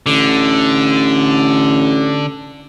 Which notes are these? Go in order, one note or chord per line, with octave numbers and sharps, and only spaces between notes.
A1 D3